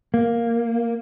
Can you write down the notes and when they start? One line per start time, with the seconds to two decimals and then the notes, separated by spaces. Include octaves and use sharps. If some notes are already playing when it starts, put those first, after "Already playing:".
0.14 A#3